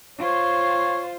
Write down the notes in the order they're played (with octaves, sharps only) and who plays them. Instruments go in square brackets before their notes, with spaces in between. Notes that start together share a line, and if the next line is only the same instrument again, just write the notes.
[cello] F4 C5 [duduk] C#5